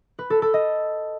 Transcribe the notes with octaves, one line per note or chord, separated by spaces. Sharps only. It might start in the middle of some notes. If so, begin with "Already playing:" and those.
B4
A4
A4
D#5